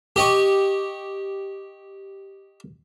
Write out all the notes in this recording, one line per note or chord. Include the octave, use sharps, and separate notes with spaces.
G4 D#5 C#6